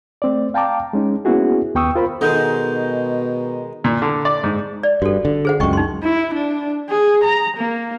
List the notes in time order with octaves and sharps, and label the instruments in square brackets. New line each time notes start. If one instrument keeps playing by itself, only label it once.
[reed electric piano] A3 C4 D5
F5 G5 A5 A#5 D6
G#3 C#4 D#4
A#3 B3 C#4 E4 F#4 G#4
D#2 B3 G5 C#6 D#6 E6
F4 A#4 C5 B5
[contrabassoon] B2 [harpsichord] D#3 G#3 [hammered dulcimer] D#4 [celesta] A4 F#5 G6
[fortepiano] A#2
D3
D5
G#2
[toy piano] D5
[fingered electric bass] G2 [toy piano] F#4 A4
[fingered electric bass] D3
[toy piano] G#4 C5 F#5
[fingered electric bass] C#2 F#2 [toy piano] D#5 G5 C#6
[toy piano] D#4 C6
[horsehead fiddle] E4
D4
G#4
A#5
A#3